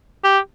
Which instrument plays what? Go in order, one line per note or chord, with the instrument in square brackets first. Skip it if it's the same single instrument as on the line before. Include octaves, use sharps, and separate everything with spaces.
[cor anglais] G4